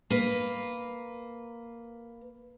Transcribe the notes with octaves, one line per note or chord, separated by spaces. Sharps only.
A#3 B4